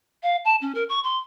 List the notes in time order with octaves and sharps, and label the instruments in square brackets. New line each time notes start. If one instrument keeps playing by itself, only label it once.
[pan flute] F5
A5
C#4
A#4
C#6
C6